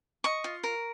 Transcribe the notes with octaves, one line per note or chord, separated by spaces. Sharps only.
D#5 C#6
F4
A#4